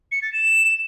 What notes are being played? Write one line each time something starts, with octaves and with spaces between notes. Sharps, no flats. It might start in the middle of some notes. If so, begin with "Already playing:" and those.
C#7
A6
E7